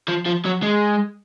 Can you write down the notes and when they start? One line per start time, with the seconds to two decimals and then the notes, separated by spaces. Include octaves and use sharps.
0.08 F3
0.26 F3
0.45 F#3
0.62 G#3